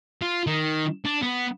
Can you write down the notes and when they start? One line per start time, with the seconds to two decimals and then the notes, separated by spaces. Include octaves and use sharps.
0.22 F4
0.47 D#3
1.05 D4
1.22 B3